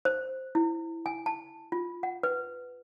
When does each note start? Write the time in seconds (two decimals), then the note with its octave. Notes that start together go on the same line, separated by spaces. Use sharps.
0.05 C5
0.55 E4
1.06 G#5
1.26 A5
1.72 F4
2.03 F#5
2.23 B4